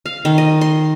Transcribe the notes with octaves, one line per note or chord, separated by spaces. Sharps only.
F5
D#3
D#5
C6